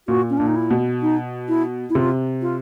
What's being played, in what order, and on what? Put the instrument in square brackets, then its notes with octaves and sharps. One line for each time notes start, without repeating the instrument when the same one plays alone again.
[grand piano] A#2 [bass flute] F#4
[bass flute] C#4
[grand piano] A#2 [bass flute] D4
[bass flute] D#4
E4
[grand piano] B2
[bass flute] D#4
E4
E4
[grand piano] C3 [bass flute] F4
[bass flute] F4